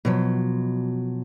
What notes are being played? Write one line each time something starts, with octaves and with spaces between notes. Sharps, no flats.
B2 F3 F#3